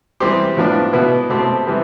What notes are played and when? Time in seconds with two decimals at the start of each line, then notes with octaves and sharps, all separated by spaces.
0.20 E3 G3 C4 G4 C5
0.57 A2 F3 B3 D4
0.93 B2 B3 E4 B4
1.30 B2 A3 C4 G4 C5
1.66 C3 E3 G3 B3